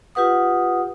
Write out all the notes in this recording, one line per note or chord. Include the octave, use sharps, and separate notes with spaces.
F4 G4 B4 F#5 D#6